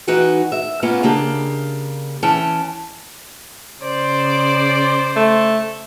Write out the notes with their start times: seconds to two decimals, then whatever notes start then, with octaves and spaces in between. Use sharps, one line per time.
0.07 E3 D#4 F#4 B4 G5
0.52 E5
0.82 A#3 B3 C#4 F4
1.03 C#3 A#3 D4 G4
2.22 E3 C#4 G5 A5
3.82 C#3 C5 D5 D6
5.16 A3